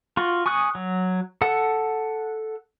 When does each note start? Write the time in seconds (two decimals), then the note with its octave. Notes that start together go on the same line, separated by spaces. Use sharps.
0.17 F4 F#4
0.46 G#5 C#6 D#6 F#6
0.75 F#3
1.41 A4 F#5